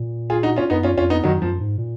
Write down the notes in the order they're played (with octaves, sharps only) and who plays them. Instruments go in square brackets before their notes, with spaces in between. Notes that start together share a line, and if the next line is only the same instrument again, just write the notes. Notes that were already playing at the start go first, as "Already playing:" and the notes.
Already playing: [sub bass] A#2
[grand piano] F4 G#4
D#4 F#4
C#4 F4
[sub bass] F#2 [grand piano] B3 D#4
[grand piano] C#4 F4
[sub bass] F2 [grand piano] C#4 F4
[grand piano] B3 D#4
[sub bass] F#2 [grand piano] D#3 F#3
[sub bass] F#2 [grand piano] F3
[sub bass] G#2
A#2